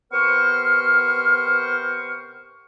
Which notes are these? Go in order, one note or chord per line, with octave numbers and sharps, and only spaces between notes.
C3 B3 A#4 C5 C#6 F6